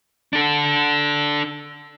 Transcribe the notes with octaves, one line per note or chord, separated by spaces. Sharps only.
D4 A4